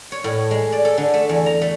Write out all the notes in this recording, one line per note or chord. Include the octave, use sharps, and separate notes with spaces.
C#5
A2
G#3
D5
A4
D3
A3
E2
A#5
A3